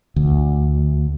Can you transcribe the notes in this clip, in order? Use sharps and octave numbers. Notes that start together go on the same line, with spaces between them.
D2